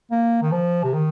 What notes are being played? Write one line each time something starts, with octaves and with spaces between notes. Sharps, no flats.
A#3
D#3
F3
C3
D#3